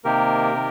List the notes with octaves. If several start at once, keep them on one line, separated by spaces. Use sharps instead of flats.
C3 D#3 A#3 G4 A#4
C3 D#3